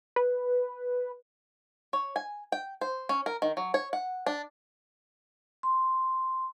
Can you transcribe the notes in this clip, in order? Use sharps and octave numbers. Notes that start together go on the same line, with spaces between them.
B4
C#5
G#5
G5
C5
C#4
A#4
D#3
F#3
C#5
F#5
D4
C6